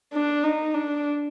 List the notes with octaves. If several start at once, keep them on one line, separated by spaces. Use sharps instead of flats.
D4
D#4
D4